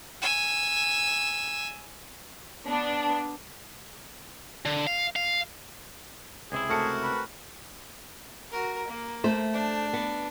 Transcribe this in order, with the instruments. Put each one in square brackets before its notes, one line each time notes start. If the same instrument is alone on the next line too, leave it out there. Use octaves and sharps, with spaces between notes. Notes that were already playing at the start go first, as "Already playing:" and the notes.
[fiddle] G#5 E6
[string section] B3 D4
[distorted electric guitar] D3
F5
F5
[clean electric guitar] C#2 C3 E4 [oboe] G#4
[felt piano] A3 A5 C#7 [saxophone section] C4 F#4 A#4
[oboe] B4
[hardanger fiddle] F#4 A#4
A#3
[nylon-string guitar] A3 C5
[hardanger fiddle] D4
[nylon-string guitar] B3